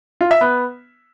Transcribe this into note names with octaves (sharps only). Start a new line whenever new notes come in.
F4
E5
B3